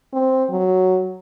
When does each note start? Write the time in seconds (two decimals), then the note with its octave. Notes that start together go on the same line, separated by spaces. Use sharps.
0.13 C4
0.50 F#3